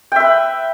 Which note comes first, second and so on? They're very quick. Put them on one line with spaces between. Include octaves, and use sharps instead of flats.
G5 E5 B4